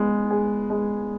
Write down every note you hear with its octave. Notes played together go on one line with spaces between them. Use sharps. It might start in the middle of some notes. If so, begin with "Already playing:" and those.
Already playing: G#3 B3
G#4
G#3